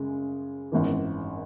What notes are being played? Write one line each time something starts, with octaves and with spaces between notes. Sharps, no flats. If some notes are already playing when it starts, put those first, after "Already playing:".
Already playing: F#2 C#3 G#3
G#1 F#2 E3